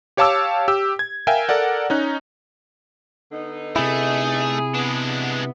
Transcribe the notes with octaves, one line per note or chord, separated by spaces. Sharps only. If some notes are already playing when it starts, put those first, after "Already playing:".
G4 C#5 F5 A5 D6 E6
G4 E6
G#6
A#4 E5 F5 G5 G#5
A4 A#4 D5 F#5
C#4 D#4 F#6
D3 B3 D#4
C3 A3 E4 G#4
G#3 B3 D4